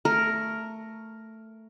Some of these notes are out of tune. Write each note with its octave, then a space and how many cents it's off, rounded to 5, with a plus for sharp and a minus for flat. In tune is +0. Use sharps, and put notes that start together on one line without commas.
A3 +10 A#4 +0